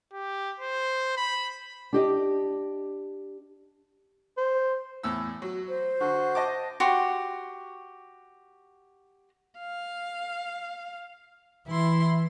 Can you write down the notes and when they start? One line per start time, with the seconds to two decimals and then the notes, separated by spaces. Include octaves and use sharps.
0.13 G4
0.60 C5
1.17 B5
1.93 D4 G4 D#5
4.38 C5
5.03 E2 A2 E6
5.42 F#3
5.68 C5
6.00 D3 F#4
6.35 D#5 A5 D6
6.80 F#4 G4 C6
9.60 F5
11.68 E3 E4 C6